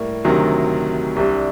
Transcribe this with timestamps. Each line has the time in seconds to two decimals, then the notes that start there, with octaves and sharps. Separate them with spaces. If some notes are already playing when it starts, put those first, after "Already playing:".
Already playing: A2 G3 A#3
0.24 D2 C3 D#3 F#3
1.16 C2 C3 G3 D4